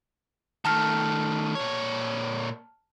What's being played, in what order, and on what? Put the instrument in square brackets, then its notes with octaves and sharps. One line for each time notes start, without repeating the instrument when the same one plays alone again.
[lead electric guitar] D#3 A3 [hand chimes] A5 A#5 F6
[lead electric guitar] A#2 C#5